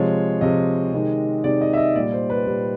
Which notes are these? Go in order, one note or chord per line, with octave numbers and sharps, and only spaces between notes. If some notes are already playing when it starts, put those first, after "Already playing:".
Already playing: C3 F3 G#3 C#5
C3 F3 G#3 D#5
C3 D#3 G#3
C3 D#3 G#3 D5
D#5
E5
D#5
A#2 G3 D5
C5
B4
A#2 G3